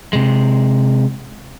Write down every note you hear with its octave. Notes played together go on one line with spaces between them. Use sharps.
C3 G#3